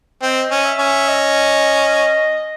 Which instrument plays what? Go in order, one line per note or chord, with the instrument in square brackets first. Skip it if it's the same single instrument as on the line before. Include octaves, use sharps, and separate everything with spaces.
[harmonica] C4 [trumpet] D#5
[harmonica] C#4
[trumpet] E5
[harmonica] C#4
[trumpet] D#5